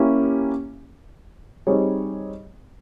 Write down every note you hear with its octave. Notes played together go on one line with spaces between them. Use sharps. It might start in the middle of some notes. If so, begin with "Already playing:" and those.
Already playing: A#3 C#4 E4 G4
G3 C4 D#4 G#4 C#5